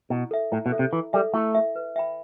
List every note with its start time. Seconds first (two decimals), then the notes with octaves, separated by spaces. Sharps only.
0.10 B2 E4
0.31 A4 E5
0.52 A2 E4
0.66 B2
0.72 A4 E5
0.79 C3
0.93 E3 E4
1.13 G3 A4 E5
1.34 A3 E4
1.55 A4 E5
1.75 B4
1.96 E5 G5 B5